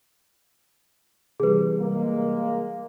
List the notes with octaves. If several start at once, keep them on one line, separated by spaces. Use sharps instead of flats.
C3 E3 G3 G#4 B4
G#3 A#3